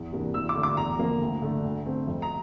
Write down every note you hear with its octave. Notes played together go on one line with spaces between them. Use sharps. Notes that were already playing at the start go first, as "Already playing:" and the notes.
Already playing: E2
C3 E3 A#3 D4
E2 E6
D6
D3 A3 D4
D6
E2 A#5
D3 F3 A#3
D2
D3 A3 D4
D2
D3 A3 C4
F2
A#5